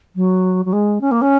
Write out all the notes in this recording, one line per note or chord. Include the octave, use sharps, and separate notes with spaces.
F#3
F#3
G#3
C#4
A#3
C#4